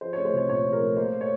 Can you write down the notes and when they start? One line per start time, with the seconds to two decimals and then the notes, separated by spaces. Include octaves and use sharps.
0.01 F3 C5
0.13 A3 C#5
0.25 C5
0.33 C2 C#5
0.49 A#2 C#5
0.65 F3
0.73 A#4
0.81 A3
0.97 A#3 C5
1.21 C#5